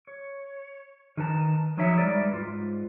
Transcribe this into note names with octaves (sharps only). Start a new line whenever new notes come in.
C#5
D#3 D#4 B4 A5 A#5
F3 F#3 D#4 C#5 E5
G3 G#3 D#4 B4 D5
G#2 F4